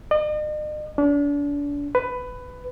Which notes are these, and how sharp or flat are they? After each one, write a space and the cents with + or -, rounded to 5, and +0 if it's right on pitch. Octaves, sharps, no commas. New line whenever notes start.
D#5 -45
D4 -35
B4 +15